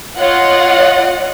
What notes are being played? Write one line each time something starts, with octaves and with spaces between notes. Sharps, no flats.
F4 C#5 D#5 F#5